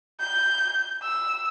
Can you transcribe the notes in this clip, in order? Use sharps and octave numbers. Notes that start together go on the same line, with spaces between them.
G6
E6